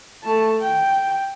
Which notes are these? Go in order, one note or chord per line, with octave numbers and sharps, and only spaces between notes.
A3 A5
G5